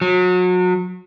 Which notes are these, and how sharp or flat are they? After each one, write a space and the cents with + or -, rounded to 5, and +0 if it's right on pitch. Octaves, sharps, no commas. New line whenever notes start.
F#3 -30